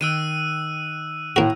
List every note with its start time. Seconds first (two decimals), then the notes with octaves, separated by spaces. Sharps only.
0.01 D#3 G5 E6 F#6 D#7
1.36 A2 A#3 F#4 A#5